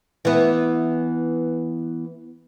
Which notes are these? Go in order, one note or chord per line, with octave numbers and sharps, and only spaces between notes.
E3 B3